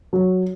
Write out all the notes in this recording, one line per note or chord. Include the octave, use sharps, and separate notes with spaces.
F#3